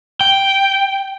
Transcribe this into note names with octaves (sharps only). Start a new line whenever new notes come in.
G5